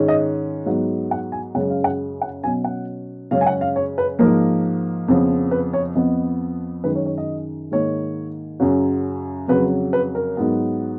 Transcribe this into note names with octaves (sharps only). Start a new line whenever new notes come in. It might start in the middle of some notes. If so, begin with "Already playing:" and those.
Already playing: G#2 D#3 G#3 C#4
D#5
G#2 F#3 B3
F#5
G#5
F#2 C#3 G#3 C#4 F#5
F5
F#5
F#5
B2 F#3 C#4 G#5
F#5
F#2 C#3 G#3 C#4 F5
G#5
F#5
F5
C#5
B4
G#2 F3 A#3 A#4
F2 C#3 F3 B3
B4
C#5
F2 F3 B3 D#5
F#2 D#3 G#3 B4
C#5
C#5
D#5
G#2 D#3 A#3 C#5
F#2 C#3 F#3
F2 C#3 F#3 B4
B4
A#4
G#2 F#3 B3